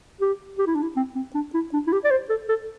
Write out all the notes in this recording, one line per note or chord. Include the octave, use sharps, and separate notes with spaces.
G4
G4
E4
D4
E4
C4
C4
D4
E4
D4
E4
G4
D5
C5
A4
A4